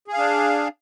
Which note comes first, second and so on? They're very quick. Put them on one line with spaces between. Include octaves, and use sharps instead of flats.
G#4 F5 D4